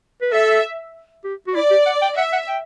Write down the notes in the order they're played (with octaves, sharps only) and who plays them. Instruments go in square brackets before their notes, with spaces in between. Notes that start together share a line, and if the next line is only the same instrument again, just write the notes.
[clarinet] B4
[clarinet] A4 [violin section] E5
[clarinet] G4
F#4
[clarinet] E4 [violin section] D5
[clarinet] G4
F#5
G5
[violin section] E5 [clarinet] F#5
[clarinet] F#5
G5